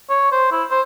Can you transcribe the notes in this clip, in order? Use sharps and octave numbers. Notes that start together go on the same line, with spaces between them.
C#5
C5
E4
C5